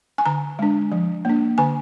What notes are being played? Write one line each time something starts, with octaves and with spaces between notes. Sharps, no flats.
G#5
D3 A#5
G#3 D4
F3
A#3 D4
D3 G#5